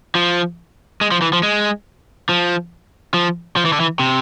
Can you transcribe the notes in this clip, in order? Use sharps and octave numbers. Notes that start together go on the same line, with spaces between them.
F3
G#3
F3
E3
F3
G#3
F3
F3
F3
E3
D3
E3
C3